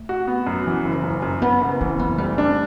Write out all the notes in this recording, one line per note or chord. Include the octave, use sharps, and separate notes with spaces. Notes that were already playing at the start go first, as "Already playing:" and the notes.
Already playing: A3
F#4
B3
F#2
E3
F#1
F#2
F#2
F#2 B3
F#1
E3 C4
F#1 B3
G3 A3
D4